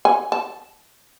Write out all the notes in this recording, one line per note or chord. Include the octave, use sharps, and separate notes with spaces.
G#5
A5